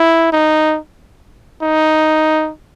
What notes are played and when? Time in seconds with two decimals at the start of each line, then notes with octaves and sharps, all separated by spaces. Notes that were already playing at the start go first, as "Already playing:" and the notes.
Already playing: E4
0.33 D#4
1.62 D#4